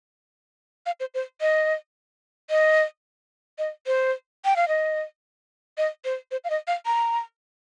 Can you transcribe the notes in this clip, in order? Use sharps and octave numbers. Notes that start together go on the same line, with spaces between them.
F5
C5
C5
D#5
D#5
D#5
C5
G5
F5
D#5
D#5
C5
C5
F5
D#5
F5
A#5